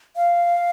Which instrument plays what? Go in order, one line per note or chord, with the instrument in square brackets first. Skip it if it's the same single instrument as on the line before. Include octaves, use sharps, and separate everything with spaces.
[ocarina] F5